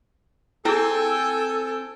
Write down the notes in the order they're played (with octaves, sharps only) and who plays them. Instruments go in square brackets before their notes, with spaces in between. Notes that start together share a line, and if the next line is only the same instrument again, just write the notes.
[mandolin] C4 [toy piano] E4 G#4 [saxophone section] A4 [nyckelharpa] G5 G#5